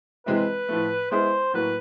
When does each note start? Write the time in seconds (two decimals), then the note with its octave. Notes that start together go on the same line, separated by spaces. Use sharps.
0.26 C3 E3 G#3 C4 E4 B4
0.69 A2 F3 A3
1.11 G#3 B3 E4 G#4 C5
1.54 A2 F#3 A#3 B4